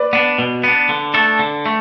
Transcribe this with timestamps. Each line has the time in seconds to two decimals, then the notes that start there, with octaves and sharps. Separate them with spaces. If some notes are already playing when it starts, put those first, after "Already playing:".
Already playing: B4 D5
0.13 B3 D4
0.39 B2
0.64 B3 D4
0.89 D3
1.14 A3 D4 A4
1.39 D3
1.66 A3